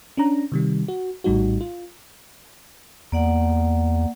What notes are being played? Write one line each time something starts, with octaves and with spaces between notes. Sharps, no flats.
C#4 D4 A#5
C3 D#3 G3
F#4
A#1 A2 G3 D#4 F#4
F4
E2 A#3 D5 F#5